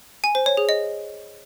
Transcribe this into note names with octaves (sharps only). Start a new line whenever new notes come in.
G#5
C5
C#5
G#4
D#5